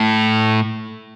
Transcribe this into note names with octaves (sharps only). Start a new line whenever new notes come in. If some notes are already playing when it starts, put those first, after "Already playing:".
Already playing: A2